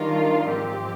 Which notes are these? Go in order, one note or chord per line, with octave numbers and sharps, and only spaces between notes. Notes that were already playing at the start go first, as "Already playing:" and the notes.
Already playing: D#3 G3 D4 F4 A#4
G#2 F3 C4 G4